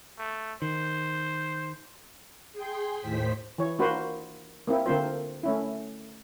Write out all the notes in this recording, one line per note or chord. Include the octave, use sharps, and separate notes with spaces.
A3
D#3 C5
G#4 G5 C6
D#2 A2 C5 B6
E3 C#5
A#3 D4 F#4 B4 C5
A#3 C4 E4
D3 A#3 C4 F4 C5
A3 C#4 E4